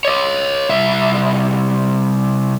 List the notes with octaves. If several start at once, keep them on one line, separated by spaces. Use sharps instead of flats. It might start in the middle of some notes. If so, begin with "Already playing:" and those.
C#5 D#5
C2 E5